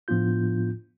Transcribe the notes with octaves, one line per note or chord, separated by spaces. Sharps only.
A2 F3 B3 D4 F4 G6